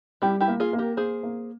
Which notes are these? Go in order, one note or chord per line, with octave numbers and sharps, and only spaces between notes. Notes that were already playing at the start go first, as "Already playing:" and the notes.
G3 E4 G4
E4 G4
A#3
F4 G#4
A#3
G4 A#4
A#3 G#4 C5
A#3